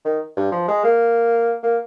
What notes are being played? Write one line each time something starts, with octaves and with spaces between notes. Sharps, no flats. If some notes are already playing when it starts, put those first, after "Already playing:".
D#3
G2
F3
G#3
A#3
A#3